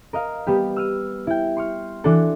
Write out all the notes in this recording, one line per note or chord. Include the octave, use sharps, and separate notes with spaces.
A#4 D#5 F5
G3 B3 G4
E6 F6 D#7
E4 G5
C6 C#6 F6
E3 D4 F#4 A4